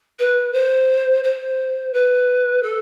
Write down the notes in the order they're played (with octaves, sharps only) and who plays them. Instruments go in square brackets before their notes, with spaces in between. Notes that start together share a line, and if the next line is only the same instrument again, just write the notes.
[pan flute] B4
C5
C5
B4
A4